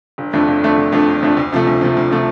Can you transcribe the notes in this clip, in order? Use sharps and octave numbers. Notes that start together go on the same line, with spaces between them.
G1
F2 D3 A3 D4
G1
F2 D3 A3 D4
G1
F2 D3 A3 D4
G1
F2 D3 A3 D4
D2
C3 F3 A3
D2
C3 F3 A3
D2
C3 F3 A3